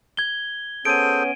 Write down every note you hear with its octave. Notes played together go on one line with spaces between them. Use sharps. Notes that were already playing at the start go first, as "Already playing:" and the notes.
G#6 G7
B3 C#4 G#4 A4 C5 D7 D#7